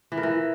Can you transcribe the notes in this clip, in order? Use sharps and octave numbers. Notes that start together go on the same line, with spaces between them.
E3
A#4
E3